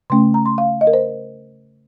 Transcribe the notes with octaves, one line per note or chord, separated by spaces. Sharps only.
C#3 A3 C#4 C6
A#5
C6
F5
D#5
A#4
C5